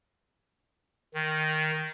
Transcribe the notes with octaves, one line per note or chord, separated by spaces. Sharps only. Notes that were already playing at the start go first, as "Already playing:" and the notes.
D#3